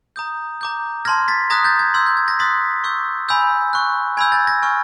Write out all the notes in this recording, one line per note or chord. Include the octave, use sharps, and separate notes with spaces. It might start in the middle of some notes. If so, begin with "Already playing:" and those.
A#5 D#6 G6
A#5 D6 G6
A5 C6 F6 G#6 A#6
A6 B6
A#5 D#6 F#6 G#6 A#6
G6 A6
G#6
C6 E6 G6 G#6
G6
G#6
G#6 A#6
C6 D#6 F#6 A6 B6
C#6 E6 G6
G#5 B5 E6 G6
C#6 F#6
G#5 B5 E6 G6 G#6
G6 A6
G#6 A#6
G#5 C#6 F6